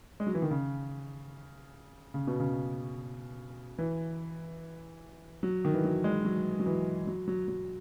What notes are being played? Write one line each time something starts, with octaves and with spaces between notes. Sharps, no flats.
G#3
F#3
E3
D#3
C#3
C#3
B2
C#3
E3
F#3
D#3
E3
F#3
G#3
F#3
F#3
E3
F#3
F#3
F#3